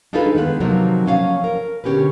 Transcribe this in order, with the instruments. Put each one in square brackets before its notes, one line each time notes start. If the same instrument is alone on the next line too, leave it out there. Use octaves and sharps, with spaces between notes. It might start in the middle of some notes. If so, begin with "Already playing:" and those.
[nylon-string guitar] D4 D#4 F4 G#4 A4 B4
D#3 G#3 B3 B4
C3 F3 F#3 A#3 C4 D#4
F3 F#3 C#4 F5
A#4
B2 D3 C#4 G4 G#4 B4